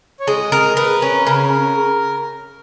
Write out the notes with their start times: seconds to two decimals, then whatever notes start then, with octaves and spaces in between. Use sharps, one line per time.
0.20 C#5
0.27 G#3 D#5
0.52 A#4
0.77 A#4 B4
1.02 C#4
1.27 C#3 A#4